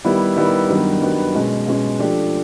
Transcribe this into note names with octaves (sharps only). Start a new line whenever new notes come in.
D#3 G3 B3 E4
D#3 G3 B3 E4
G2 D#3 F#3 B3
G2 D#3 F#3 B3
B2 G#3 C#4
B2 G#3 C#4
F3 A3 D4 G4